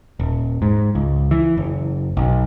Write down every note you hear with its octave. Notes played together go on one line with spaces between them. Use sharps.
D#1
G#2
C#2
E3
F#1
B1